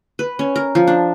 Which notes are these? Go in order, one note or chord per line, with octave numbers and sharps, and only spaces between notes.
B4
C#4
A#4
F3
D4